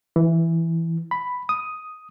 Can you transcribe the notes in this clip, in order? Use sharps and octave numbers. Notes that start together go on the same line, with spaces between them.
E3
B5
D#6